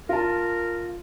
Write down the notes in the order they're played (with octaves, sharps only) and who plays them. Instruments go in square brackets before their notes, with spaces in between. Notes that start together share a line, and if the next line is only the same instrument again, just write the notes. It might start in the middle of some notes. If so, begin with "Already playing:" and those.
[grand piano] F4 A5 [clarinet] A#4